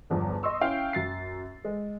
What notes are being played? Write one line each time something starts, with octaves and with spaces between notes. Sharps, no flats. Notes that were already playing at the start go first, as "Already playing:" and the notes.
G1 E2 F3
D#5 C6 C#6 E6
C#4 E4 F5 G5
F#2 A6 C7
G#3